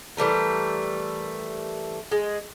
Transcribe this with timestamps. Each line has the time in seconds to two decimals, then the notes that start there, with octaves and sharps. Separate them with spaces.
0.17 E3 G3 A3 A#4
2.12 G#3